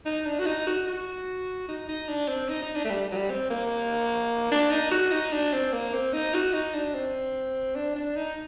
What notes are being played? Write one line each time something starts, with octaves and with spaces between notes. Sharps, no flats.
D#4
D4
F#4
D#4
F#4
F#4
D#4
D#4
D4
C4
D#4
D#4
D4
A3
G3
F#3
G3
C4
A#3
D4
D#4
F#4
D#4
D4
C4
A#3
C4
D#4
F#4
D#4
D4
C4
D4
D4
D#4